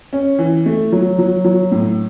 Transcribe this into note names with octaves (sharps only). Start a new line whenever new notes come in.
C#4
E3
A3
F#3
F#3
F#3
A2